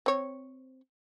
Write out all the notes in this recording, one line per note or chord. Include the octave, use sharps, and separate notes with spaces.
C4 C#5